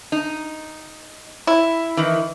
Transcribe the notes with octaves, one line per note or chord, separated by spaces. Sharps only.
D#4
E4
D#3 E3